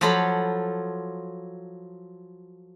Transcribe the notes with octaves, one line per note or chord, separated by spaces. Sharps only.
F3 F#3 F4 A4 B5